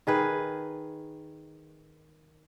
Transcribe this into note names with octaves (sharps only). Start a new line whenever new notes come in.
D#3 G#4 B4